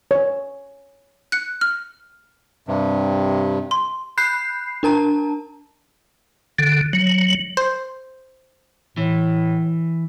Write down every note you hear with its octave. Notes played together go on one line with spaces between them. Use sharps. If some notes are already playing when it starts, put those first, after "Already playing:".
C#5
F#6 C#7
F6
G2 C3
C6
B5 F#6 G6 C7
D4 A#4 A5 A#5
D3
F#3
C5
A2 E3